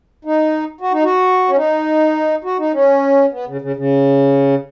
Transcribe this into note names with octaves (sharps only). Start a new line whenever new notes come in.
D#4
F#4
D#4
F#4
C#4
D#4
F#4
D#4
C#4
B3
C#3
C#3
C#3